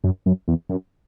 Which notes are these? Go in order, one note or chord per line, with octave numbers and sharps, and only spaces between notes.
F#2
F#2
E2
F#2